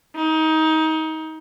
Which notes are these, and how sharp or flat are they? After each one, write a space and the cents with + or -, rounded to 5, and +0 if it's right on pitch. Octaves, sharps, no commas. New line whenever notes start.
D#4 +25